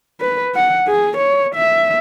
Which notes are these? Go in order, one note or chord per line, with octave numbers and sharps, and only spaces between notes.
B4
F#5
G#4
C#5
E5